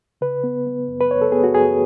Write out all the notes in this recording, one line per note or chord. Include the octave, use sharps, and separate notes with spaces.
C#3 B4
B3
B3
F#2
B4
F#2 C#5
A4
B3 G#4
F#4
F#2 G#4